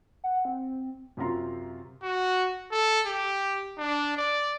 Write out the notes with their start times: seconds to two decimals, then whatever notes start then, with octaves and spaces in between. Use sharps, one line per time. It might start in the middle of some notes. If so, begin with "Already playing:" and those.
0.24 F#5
0.45 C4
1.17 F#2 C3 F4 A#5 C6
2.03 F#4
2.72 A4
3.07 G4
3.78 D4
4.17 D5